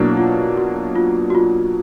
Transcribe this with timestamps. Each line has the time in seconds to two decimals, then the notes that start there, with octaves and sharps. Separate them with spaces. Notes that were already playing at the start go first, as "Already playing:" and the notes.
Already playing: B2 F#3 A#3 D4 E4
0.17 F4
0.57 F#4
0.96 F4
1.30 F#4
1.35 F4